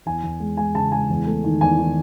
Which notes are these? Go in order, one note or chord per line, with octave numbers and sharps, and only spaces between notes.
E2 G#5
E2
G#3
G#3 G#5
C#3 A5
G#3 G#5
E2
A3
D#3
E2 G#5
D#3